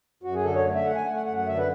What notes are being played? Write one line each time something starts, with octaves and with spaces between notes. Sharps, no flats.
F#2 F#4
G#4
D3 A4
C#5
A3
E5
A3 F#5
G#5
A3 F#5
F#5
F#2 F#5
F#5
D3 E5
B4